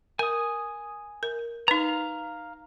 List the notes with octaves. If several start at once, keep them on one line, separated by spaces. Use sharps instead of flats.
A#4 G#5 D#6
A#4
D#4 B4 F5 A#5